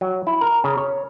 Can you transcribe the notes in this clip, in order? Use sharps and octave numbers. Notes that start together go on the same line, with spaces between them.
F#3
E4
A#4
C#3
C#5